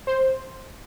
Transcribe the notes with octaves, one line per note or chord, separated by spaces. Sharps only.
C5